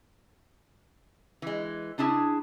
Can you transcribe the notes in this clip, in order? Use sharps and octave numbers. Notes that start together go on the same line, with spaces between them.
E3 G#3
C#3 D4 E4 G#4 A5